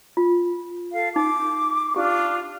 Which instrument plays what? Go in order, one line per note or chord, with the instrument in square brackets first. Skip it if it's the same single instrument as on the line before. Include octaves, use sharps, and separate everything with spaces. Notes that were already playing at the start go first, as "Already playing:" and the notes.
[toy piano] F4
[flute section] A4 F5
[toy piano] D#4 [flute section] D6
[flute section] D4 F4 [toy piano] G4